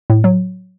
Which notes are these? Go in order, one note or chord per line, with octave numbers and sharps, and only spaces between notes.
A2
F#3